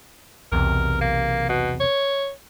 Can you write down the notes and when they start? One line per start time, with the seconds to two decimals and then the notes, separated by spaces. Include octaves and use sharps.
0.52 B1 E2 C3 A#4
1.01 A#3
1.49 B2
1.80 C#5